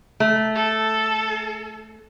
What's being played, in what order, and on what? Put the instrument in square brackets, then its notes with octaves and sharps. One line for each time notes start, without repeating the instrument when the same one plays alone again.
[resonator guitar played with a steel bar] A3
[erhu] A4